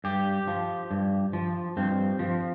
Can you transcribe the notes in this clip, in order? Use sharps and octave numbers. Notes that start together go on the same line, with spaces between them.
G2 G4
F3
G2
F3
G2 C4
F3